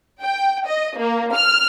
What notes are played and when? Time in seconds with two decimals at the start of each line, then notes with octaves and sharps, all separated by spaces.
0.21 G5
0.66 D#5
0.98 A#3
1.33 F6